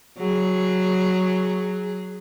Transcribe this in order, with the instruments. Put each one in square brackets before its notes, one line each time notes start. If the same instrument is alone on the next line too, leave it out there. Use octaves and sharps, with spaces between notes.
[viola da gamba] F#3 G#4